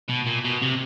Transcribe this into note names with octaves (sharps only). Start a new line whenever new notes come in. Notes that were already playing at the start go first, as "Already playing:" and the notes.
B2
A#2
B2
C3